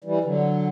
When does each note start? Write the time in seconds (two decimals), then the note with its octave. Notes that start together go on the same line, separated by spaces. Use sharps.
0.04 E3 G3
0.24 D3 F#3